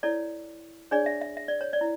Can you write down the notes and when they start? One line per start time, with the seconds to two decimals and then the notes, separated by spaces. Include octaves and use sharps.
0.03 E4 A4 C#5 D5
0.91 D4 G#4 C#5 D5
1.06 E5
1.21 E5
1.37 E5
1.48 D5
1.61 C#5
1.73 D5
1.81 E4